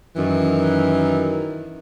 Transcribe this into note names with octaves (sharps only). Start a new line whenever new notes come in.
F#2 D#3 E3